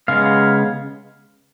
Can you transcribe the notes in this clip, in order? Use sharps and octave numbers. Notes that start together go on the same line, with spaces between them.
C#3 G#3 B3 F5